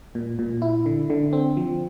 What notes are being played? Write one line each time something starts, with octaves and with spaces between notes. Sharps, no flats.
A#2
A#2
E4
D3
D3
C4
F3